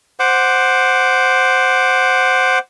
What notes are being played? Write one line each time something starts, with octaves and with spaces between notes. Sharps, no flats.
C5 F#5 D6